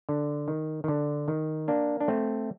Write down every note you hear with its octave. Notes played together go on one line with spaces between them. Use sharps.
D3
D#3
D#3
D3
D#3
A#3 D4
D4
A3 C4